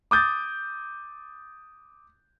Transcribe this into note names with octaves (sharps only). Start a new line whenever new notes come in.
D6 D#6 G6 A6